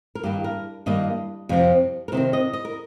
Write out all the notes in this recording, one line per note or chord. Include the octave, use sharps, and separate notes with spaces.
A#4
G2 D#3 A#3 G4
A#4
G2 D#3 G3 A#3 D#5
F2 C3 F3 C4
A#4
C3 D#3 C4 C5
D#5
D#5
A#4